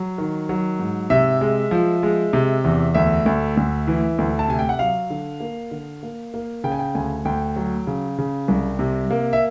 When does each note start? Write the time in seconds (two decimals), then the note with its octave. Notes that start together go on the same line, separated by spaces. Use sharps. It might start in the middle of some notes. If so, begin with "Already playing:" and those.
Already playing: F#3
0.18 D#3
0.49 F#3
0.79 G#2
1.10 C3 E5
1.41 G#3
1.71 F3
2.03 G#3
2.33 C3
2.64 E2
2.94 D2 E5
3.26 D2
3.57 D2
3.87 E3
4.18 D2
4.39 A5
4.48 C3 G#5
4.59 G5
4.69 F#5
4.79 F#3 F5
5.10 D3
5.40 A#3
5.71 D3
6.03 A#3
6.34 A#3
6.64 C#3 G5
6.72 G#5
6.79 G5
6.95 D2 G#5
7.25 D2 G5
7.56 F#3
7.87 C#3
8.18 C#3
8.48 C2
8.79 C3
9.11 A#3
9.33 E5